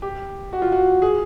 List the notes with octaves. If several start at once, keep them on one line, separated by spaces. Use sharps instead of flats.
G4
F#4
F4
F#4
G#4